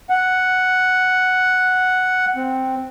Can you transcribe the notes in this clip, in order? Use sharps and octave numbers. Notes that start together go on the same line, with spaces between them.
F#5
C4